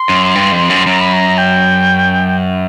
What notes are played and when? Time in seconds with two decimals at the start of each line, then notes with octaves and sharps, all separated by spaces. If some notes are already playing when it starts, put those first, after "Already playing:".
Already playing: C6
0.09 F#2
0.35 G2
0.52 F2
0.70 F#2
0.86 F#2 A#5
1.00 B5
1.13 A#5
1.38 G5